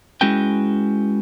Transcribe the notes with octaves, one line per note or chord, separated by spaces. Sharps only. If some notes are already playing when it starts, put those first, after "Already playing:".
G#3 C#4 E4 F#4 B4 G5